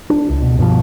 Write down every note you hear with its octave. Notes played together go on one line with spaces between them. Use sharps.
D4
C#2
B2
G2 B2 D#3 F3